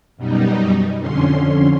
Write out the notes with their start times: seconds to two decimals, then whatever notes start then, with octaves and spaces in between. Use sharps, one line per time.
0.17 F#2 B2 G3 D#4
1.00 F2 D3 C#4 C6